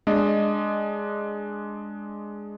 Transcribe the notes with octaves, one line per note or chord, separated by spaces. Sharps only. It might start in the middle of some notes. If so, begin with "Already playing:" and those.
G#3 D4 D#5